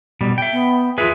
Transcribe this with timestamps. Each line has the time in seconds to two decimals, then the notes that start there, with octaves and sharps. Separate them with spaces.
0.21 B2 G3
0.38 E5 G5
0.52 B3
0.98 F4 G#4 B4 E5